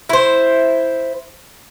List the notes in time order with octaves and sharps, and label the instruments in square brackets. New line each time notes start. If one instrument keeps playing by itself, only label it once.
[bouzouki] E4 C5